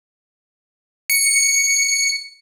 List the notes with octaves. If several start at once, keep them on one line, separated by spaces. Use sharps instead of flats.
C#7